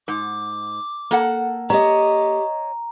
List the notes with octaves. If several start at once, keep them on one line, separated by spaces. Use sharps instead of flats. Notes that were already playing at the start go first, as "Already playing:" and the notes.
G#2 D6
A#3 A4 F#5
G4 C#5 D#5 A#5